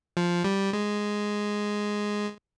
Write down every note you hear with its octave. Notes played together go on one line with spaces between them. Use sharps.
F3
G3
G#3